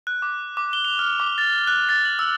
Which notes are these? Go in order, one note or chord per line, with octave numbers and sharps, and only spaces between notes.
F#6
D6
D6
G7
F7
F6
D6
A6
F#6
A6
F#7
E6